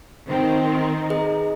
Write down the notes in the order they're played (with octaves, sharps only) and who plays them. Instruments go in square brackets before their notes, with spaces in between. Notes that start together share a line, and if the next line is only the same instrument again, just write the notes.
[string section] D#3 C4 [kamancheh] C5 G5
[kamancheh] D#4
[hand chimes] G#4 B4 D#5